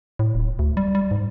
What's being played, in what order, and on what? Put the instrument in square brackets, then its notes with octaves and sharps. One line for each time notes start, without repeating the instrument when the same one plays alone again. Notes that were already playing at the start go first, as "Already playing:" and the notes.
[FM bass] A2
D#1
D2
G3
G3
G#2